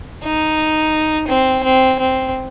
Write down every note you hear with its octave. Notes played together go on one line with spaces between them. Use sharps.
D#4
C4
C4
C4